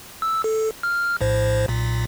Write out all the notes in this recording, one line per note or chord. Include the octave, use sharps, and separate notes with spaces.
E6
A4
F6
A#1 A2 C5
B1 A#2